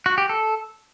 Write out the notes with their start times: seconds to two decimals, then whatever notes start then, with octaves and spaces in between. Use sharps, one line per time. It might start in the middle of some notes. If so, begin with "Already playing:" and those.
0.06 F#4
0.18 G4
0.29 A4